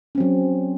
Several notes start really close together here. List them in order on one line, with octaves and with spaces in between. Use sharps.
C#4 C4 F#3